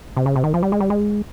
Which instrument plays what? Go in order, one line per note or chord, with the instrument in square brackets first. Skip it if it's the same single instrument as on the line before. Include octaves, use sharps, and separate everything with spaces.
[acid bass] C3
C#3
C3
D#3
F3
G3
G#3
G3
G#3